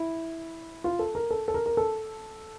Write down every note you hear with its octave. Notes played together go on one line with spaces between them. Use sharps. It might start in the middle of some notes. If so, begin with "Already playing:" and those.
Already playing: E4
F4
A4
A#4
A4
A4
A#4
A#4
A4